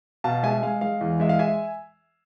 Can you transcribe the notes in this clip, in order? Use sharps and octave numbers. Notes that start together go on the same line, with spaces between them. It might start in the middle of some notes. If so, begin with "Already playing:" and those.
B2 F5 A5
G#3 E5 G#5
G#3 F5
G#3 F5
E2
G#3 E5
F5
E5 G#5